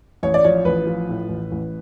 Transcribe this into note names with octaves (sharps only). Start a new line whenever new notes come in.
A1 C#5
D5
F3 C#5
A1 B4
F3
A2
A1
A1